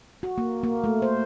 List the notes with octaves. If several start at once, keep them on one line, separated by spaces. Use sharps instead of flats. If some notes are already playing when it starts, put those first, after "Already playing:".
F#4
A#3
A#3
A3
C5